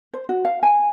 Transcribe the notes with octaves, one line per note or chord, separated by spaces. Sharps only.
C5
F#4
F5
G#5